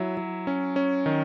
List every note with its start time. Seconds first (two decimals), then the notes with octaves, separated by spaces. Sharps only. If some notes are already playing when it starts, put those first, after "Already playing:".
Already playing: F#3 E4 E5
0.17 F#3
0.47 C#4
0.76 C#4
1.06 D#3